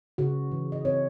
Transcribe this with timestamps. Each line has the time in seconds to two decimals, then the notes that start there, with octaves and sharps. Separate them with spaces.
0.18 C#3 F#4
0.52 E3
0.72 D#5
0.85 C4 C#5